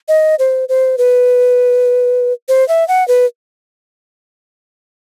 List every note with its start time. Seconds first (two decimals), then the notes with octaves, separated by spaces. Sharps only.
0.08 D#5
0.39 C5
0.69 C5
0.98 B4
2.49 C5
2.68 E5
2.88 F#5
3.08 B4